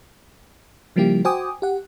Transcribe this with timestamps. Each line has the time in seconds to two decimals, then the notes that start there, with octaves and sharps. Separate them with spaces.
0.96 C#3 F3 G3 A#3 E4 G4
1.25 F#4 C5 G5 G#5 D6 D#6
1.62 G4 F#5